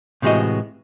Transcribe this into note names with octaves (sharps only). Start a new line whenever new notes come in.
A2 C3 E3 G#3 F#4 D#5